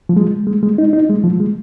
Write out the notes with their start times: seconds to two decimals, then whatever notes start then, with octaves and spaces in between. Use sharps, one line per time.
0.09 F3
0.17 G#3
0.47 G#3
0.63 G#3
0.78 D#4
0.93 D#4
1.09 G#3
1.24 F3
1.40 G#3